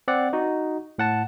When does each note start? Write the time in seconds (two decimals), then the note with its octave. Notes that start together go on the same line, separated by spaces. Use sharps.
0.08 C4 D5 F#5
0.33 D#4 F#4
0.98 A2 F#5 A5